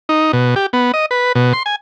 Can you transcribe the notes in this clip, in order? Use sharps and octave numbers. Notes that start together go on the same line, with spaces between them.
D#4
B2
G4
B3
D#5
B4
B2
C6
G#5